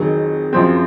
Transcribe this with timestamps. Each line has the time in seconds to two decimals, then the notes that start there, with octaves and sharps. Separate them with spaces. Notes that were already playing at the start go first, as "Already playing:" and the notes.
Already playing: F2 D#3 F#3 G#4
0.53 F#2 F3 C4